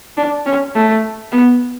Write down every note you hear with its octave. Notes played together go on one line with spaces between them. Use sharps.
D4
C#4
A3
B3